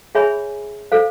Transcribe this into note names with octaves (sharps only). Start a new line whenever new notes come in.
G#4 C#5 E5 G#5 B5
A4 C5 F5